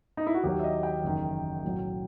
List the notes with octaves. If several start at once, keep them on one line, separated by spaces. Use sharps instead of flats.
D#4
E4
F#4
D#2 D#3 F#3 G4
E5
D#5
G5
F#1 E2 D#3
B1 A2 F#3